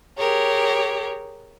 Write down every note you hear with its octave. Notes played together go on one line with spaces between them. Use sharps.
G4 G#4 A#4 C#5